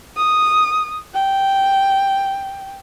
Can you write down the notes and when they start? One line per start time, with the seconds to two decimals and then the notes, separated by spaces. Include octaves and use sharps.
0.16 D#6
1.14 G5